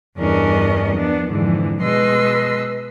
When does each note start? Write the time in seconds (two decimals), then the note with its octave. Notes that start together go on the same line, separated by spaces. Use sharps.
0.18 E2 G2 C#4 D4 A#4 D#5
0.95 F3 B3 D4
1.30 F2 G#2 D3 E3
1.82 B2 G#3 B4 D#5 C6 E6